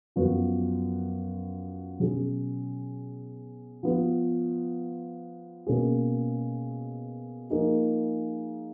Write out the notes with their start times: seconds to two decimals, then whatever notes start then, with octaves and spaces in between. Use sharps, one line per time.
0.16 F#2 F3 B3 F#4
1.99 B2 F#3 C#4 G#4
3.83 F3 B3 F4
5.67 B2 A#3 C#4 G#4
7.50 F3 A#3 D#4 G#4